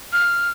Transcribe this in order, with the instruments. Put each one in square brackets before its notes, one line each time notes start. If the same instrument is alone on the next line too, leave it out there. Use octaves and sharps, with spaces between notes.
[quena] F6